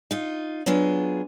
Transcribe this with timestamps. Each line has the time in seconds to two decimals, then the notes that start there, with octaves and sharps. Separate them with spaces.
0.11 D#4 F4
0.66 F#3 B3 D4 F4 G#4